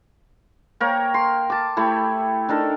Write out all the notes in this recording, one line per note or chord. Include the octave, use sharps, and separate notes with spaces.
A#3 A#4 C#5 G5
C6
A5 D6
A3 E4 G4
D4 D#4 A4 A#4